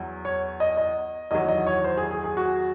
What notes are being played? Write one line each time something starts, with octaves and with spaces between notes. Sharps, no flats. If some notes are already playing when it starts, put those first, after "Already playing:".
Already playing: E2 F#3
C#5
D#5
D#5
E2 D#3 F#3 D#5
D#5
C#5
C5
G#4
G#4
G#4
F#4